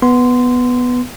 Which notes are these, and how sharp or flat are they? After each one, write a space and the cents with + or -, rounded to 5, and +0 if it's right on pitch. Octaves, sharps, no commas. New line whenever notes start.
B3 +0 C6 -15